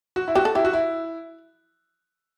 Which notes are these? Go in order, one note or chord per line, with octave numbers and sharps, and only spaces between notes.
F#4
E4
F#4 G4
A4
E4 G4
F#4
E4